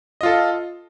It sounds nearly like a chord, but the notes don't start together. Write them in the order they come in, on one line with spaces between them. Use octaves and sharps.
D#5 F4 A4